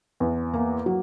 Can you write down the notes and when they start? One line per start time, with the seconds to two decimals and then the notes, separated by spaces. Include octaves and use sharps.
0.20 E2
0.54 A#3
0.86 F#3